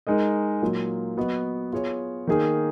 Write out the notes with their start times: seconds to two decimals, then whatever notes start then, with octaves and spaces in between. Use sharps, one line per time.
0.07 G#3 D#4 A#4 D#5
0.62 A#2 F#3 A#3 F4
1.17 F#3 B3 F#4 B4 D#5
1.73 B3 F4 G#4 C#5
2.27 D#3 A#3 D#4 G#4